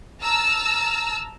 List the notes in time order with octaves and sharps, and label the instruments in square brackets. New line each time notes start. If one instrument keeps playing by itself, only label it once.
[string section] A5 A#5 E6 F6